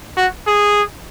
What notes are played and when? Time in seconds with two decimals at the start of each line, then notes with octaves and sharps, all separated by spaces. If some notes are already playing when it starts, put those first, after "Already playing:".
0.17 F#4
0.47 G#4